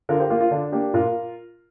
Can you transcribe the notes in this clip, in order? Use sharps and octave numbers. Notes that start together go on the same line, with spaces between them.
D3 F4 A#4
G4 C5
A#3 F4 A#4
F4
D3 D4
A#3 D4 G4
A#2 F4 A#4